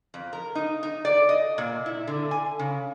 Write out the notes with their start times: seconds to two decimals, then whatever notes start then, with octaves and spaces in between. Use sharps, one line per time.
0.14 F2
0.33 A#4
0.55 D#4
0.83 D#4
1.05 D5
1.29 D#5
1.58 A#2
1.86 E4
2.07 D3
2.31 G#5
2.59 C#3